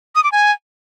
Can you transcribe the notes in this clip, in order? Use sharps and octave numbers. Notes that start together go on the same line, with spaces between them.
D#6
D6
G#5